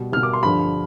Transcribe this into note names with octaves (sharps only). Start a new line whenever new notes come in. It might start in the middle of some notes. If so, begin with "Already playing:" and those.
Already playing: B2 G3
B2 G3 F6
D6
C6
G2 D3 F3 B5